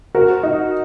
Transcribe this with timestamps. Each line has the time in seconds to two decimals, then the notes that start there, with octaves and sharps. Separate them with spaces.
0.15 F#4 A#4
0.43 D#4